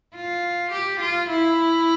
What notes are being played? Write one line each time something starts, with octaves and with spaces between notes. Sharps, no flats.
F4
G4
F4
E4